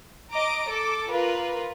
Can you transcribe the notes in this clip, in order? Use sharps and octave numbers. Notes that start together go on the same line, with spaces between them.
D#5 A#5 D6 D7
A4 D6
F4 A#4 B4